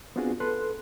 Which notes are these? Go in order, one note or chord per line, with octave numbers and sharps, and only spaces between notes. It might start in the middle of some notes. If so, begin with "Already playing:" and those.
B3 C4 D4 F4 F#4 G#4
A4 B4 C6 F#6